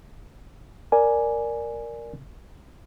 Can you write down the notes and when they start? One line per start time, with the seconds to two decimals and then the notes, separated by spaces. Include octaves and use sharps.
0.92 A#4 D5 G#5